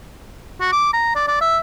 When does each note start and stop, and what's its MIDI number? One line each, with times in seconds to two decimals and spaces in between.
0.61 0.69 66
0.73 0.90 86
0.93 1.13 82
1.16 1.28 74
1.28 1.37 74
1.42 1.58 76